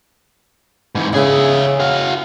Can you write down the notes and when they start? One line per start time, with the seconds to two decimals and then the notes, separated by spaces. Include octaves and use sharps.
0.95 G#2 E3
1.14 C#3 G#4 E5
1.80 F#4 F5